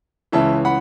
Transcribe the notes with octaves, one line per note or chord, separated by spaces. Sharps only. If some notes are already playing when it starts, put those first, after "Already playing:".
C#2 C#3 E3 E5 A5
F#5 B5